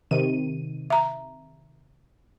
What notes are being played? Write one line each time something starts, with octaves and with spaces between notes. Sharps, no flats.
C3 D#3 D#7
E5 A#5